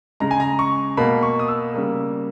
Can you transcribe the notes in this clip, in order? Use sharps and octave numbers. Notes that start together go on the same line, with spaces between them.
C#3 G#3 A#5
G#5
A#5
C#6
B2 A#3 B5
C#6
D#6
E6
C#3 G3 A#3